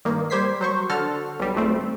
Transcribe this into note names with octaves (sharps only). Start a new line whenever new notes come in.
G2 D#3 A#3
G3 G4 C5 G#6 B6 C7
F#3 C5 C#6
D3 F#4 A4 A5 F6
B1 G3
G#1 F2 A3 C4